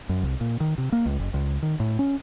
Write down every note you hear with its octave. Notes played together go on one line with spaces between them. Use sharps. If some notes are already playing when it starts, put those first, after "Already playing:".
F#2
C2
A#2
D#3
C3
A#3
C#2
F#1
C#2
D#3
A2
C#4